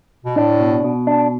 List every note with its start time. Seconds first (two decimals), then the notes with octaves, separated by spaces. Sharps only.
0.24 B2
0.36 A2 D4
0.60 B2
0.84 B2
1.07 D4